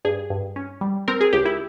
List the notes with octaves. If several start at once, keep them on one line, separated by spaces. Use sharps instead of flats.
G2 G#4
G2
C#4
G3
C4 A#4
G#4
C#2 G4
E4